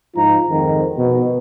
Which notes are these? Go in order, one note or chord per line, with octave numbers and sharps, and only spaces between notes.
G#2 F3 D#4 F4 A#5
F2 G#2 D#3
B2